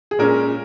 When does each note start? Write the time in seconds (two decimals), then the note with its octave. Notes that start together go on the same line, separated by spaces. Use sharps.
0.11 G#4
0.19 A#2 G#3 C#4 A#4